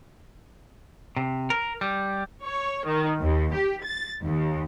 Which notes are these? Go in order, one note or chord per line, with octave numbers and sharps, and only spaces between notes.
C3
A#4
G3
C#5
D#3
D#2
G4
A6
D#2